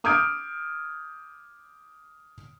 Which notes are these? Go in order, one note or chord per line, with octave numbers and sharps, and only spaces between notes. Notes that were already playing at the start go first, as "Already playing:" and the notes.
D6 D#6 F6 G6 G#6 D7